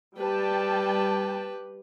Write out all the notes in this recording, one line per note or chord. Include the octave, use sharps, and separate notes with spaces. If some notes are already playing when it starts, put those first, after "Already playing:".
G3 G4 B4 G5 A5